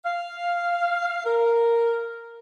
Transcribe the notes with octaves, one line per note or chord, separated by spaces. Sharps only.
F5
A#4